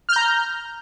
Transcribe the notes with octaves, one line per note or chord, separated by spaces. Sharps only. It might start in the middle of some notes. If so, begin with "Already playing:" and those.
A#5 F6 G6